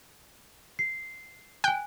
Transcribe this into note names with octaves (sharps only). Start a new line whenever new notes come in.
C7
G5 G#5 F#6